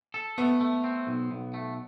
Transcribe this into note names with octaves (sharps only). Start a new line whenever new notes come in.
A4
A3 B3
A3
C4
B1
B1
A3